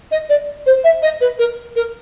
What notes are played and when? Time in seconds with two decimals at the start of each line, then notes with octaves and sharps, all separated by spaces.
0.11 D#5
0.29 D5
0.66 C5
0.84 E5
1.02 D#5
1.21 B4
1.38 A#4
1.76 A#4